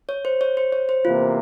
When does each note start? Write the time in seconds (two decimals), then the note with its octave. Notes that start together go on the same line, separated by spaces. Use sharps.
0.09 C#5
0.25 C5
0.41 C#5
0.57 C5
0.72 C#5
0.89 C5
1.05 E2 C3 E3 A#3 F4